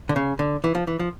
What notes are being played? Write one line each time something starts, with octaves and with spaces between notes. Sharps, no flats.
D3
C#3
D3
E3
F3
E3
F3